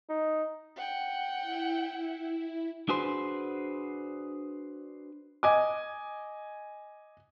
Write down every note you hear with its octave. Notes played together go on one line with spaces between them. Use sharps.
D#4
F#5 G5
E4
D4 F#4 G#4 B4 C5
D#5 G#5 D6